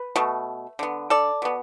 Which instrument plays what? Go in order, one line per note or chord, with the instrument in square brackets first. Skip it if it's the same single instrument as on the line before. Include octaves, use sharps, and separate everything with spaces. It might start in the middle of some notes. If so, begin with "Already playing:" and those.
Already playing: [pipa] B4
B2 A3
D3 B3
A4 D5
B2 B3